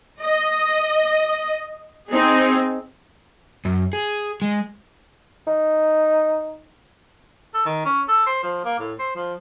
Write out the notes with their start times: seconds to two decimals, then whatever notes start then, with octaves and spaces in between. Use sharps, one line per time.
0.21 D#5
2.11 C4 D#4 G#4
3.65 F#2
3.93 G#4
4.42 G#3
5.47 D#4
7.54 A4
7.66 D#3
7.85 C#4
8.08 A4
8.27 C5
8.43 F3
8.65 A#3
8.79 A2
8.99 C5
9.16 F3